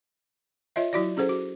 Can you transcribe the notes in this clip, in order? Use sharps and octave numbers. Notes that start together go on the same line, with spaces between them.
F4 C#5 D#5 E5
F#3 E4 F#4 D5
C#4 G#4 A4 C5
F#4